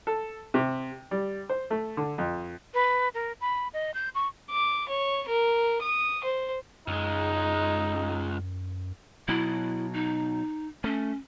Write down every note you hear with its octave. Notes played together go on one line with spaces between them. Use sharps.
A4
C3
G3
C5
A3
D3
F2
B4
A#4
B5
D#5
G6
C#6
D6
C#5
A#4
D#6
C5
C#2 F#2 G#3 D#4
B2 F#3 E4
D#4
A3 C#4